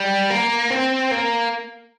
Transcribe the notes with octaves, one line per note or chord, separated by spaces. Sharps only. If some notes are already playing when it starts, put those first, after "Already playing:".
Already playing: G3
A#3
C4
A#3